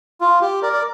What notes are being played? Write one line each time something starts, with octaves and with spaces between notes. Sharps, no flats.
F4
G4
A#4 D5
D5